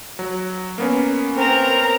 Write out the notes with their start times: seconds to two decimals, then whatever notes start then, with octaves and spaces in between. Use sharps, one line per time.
0.19 F#3
0.78 A#3 B3 C#4
1.37 C4 A#4 A#5